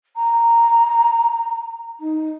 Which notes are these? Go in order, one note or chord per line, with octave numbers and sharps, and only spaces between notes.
A#5
D#4